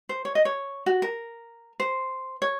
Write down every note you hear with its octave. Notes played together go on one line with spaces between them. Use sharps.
C5
C#5
D#5
C#5
F#4
A#4
C5
C#5